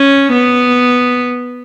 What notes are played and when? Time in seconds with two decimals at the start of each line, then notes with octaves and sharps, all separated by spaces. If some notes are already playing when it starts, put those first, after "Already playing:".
Already playing: C#4
0.33 B3